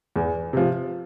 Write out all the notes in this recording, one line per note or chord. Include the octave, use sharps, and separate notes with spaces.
E2
C3 F3